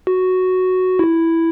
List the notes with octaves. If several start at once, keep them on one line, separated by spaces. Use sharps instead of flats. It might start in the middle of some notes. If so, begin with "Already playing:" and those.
F#4
E4